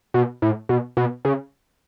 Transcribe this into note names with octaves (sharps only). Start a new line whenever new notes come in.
B2
A2
B2
B2
C#3